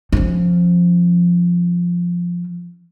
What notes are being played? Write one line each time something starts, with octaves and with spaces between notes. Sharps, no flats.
F3 C#4